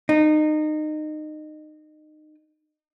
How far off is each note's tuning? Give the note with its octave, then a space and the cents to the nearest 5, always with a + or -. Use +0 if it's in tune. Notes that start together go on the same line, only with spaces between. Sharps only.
D#4 -25